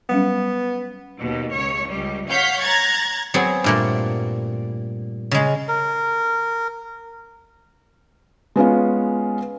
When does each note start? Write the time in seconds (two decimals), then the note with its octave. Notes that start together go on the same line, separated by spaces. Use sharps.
0.09 F#3 G3 B3 C#4
1.18 D#2 B2
1.53 C#2 C#5
1.89 C#2 G3
2.29 C#5 F5 F#5 G6 B6
2.60 A#5 F#6 G#6 A6
3.34 F#3 B3 C4 G#4
3.64 G2 A#2 A3
5.31 C#3 G#3
5.68 A#4
8.56 G#3 B3 C#4 F4